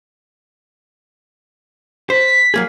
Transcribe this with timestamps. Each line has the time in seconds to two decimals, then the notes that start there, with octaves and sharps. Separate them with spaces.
2.10 C5 B6
2.54 F#3 A#3 G#4